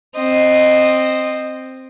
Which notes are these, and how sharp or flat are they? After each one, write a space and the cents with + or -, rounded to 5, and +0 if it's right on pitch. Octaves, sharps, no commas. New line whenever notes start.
C4 +0 D#5 -15